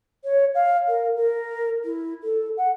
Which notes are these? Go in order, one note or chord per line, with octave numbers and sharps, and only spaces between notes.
C#5
F5
A#4
A#4
E4
A4
F#5